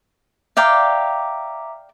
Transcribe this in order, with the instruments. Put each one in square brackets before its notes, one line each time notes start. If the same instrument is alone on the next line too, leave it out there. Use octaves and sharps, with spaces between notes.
[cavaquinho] D5 F5 G5 [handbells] E5 A#5 D6